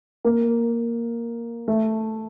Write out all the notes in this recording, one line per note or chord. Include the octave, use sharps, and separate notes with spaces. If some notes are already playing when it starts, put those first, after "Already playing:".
A#3
A3